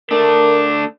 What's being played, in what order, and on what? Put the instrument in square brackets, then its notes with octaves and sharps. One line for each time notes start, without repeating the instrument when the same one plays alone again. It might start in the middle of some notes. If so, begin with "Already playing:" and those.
[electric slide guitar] A3 D4 [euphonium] A#4